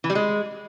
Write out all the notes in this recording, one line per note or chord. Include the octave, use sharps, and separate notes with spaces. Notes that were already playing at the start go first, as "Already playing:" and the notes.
E3
G3
G#3